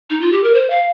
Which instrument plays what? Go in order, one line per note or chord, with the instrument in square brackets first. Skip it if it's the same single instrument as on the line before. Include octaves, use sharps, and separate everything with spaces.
[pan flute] D#4
F4
G4
A#4
C5
F5